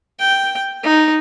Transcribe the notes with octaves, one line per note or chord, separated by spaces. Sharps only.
G5
D#4